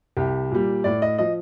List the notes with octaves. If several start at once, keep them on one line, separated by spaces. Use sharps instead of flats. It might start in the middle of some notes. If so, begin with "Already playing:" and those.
C2 G4
A#2 G3
A2 D5
D#5
F3 D#5